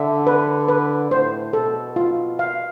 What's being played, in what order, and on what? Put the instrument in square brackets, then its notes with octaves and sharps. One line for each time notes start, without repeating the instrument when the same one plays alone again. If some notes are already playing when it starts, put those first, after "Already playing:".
Already playing: [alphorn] D3 [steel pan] E5
[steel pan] B4
B4
[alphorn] A2 [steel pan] C5
[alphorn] B2 [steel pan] A4
[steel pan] F4
F5